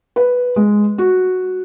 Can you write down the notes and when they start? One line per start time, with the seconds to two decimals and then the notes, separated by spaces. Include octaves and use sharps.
0.16 B4
0.56 G#3
0.98 F#4